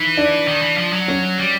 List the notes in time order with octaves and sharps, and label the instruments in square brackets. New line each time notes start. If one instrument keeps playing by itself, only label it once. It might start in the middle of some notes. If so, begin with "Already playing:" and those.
Already playing: [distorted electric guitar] E3 [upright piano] D#4
[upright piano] D4
[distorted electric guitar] D#3
E3
F3
F#3
[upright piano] C#4
[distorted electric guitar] G3